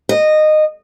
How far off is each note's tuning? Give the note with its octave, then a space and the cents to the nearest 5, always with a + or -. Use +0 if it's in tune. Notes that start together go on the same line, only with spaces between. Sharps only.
D#5 -15